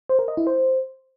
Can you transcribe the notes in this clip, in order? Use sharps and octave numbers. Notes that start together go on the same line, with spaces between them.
C5
A#4
D#5
E4
C5